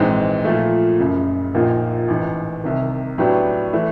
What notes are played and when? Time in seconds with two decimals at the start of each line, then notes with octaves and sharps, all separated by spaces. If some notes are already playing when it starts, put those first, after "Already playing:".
Already playing: A#1 G#2 E3 G#3 C4
0.45 A#2 F3 A3
0.99 F#1 F#2 C#3
1.54 A#1 A#2 F3 A#3 D#4
2.08 A1 G#2 E3
2.64 C2 C3 D#3
3.18 A2 F#3 B3 D4 G4
3.73 E3 A3